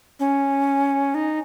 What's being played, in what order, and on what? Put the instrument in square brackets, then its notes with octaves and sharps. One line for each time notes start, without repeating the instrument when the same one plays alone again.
[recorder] C#4
D#4